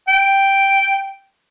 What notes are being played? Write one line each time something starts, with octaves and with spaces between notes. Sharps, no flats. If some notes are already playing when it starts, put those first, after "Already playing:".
G5